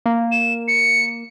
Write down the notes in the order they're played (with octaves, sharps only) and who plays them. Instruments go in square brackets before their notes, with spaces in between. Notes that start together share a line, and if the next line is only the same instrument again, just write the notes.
[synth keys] A#3
[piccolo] E7
C#7